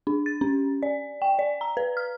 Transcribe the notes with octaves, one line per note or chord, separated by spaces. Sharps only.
D4
A6
C#4
D5
G5
D5
A#5
B4
F6